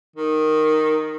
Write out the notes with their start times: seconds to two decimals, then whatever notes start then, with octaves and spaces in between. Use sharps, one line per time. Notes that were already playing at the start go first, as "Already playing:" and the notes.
0.16 D#3